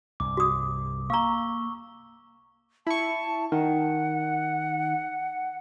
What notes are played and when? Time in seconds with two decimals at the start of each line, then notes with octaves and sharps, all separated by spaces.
0.20 C2 G2 D6
0.37 F#4 D#6
1.10 A#3 F5 A#5 C#6 E6 G7
2.87 E4 A5 C#6
3.52 D#3 F#5